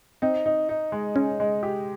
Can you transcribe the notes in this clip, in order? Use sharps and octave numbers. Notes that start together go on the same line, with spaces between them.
C4 D#4
D#4
D#4
G#3
G#3 C#4
G#3
G4